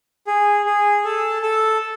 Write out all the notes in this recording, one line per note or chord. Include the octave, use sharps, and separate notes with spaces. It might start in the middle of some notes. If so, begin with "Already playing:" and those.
G#4
G#4
A4
A4